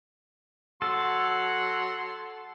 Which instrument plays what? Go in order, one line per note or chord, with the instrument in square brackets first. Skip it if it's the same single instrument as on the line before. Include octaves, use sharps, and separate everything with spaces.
[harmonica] F#3 F#5 C6 [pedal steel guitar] A4